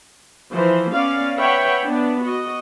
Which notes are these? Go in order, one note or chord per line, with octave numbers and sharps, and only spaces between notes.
E3 F3 C5
B3 C#4 D5 F5
B4 C#5 E5 F#5 G5 B5
B3 D4
F#4 D#5